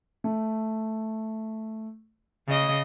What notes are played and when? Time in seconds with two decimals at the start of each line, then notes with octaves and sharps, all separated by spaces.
0.24 A3
2.48 C#3 D#5